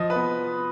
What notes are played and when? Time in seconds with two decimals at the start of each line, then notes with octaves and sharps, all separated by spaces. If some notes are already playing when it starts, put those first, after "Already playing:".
Already playing: F3 F4 D#5 D#6
0.10 B4 B5
0.16 B3